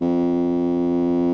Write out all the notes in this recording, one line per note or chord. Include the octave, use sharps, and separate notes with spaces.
F2